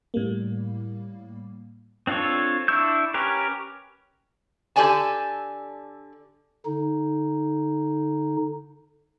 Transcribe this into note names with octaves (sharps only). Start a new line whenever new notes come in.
A2 G3 A#3
C4 D4 F4 A4 C#5
D4 E4 C#6 E6 G6
C#4 G4 A#4 B4
D3 G4 A4 D5 G#5 A5
D3 D#4